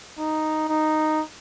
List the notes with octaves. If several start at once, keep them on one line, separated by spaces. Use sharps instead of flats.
D#4
D#4